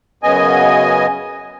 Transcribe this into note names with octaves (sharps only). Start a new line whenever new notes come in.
F#2 C#3 B3 D#5 G#5